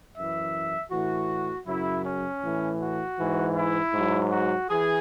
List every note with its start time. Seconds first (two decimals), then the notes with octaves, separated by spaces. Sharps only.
0.16 F#2 E3 E5
0.91 A2 E3 F#4
1.66 F#2 C#3 F#3 E4
2.04 C#4
2.42 A2 E3
2.80 F#4
3.18 G#2 E3
3.55 E4
3.93 G#2 F#3
4.32 F#4
4.69 E3 G#4